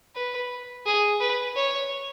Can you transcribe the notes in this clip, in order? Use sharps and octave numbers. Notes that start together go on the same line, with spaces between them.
B4
G#4
B4
C#5